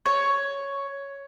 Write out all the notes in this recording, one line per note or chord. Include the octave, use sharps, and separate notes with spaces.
C#5